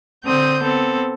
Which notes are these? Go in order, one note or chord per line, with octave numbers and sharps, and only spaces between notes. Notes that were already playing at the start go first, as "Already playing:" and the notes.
D3 C4 D#6 G6
B3 C4 A4